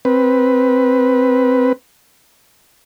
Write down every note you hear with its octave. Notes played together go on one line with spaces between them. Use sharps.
C4 B4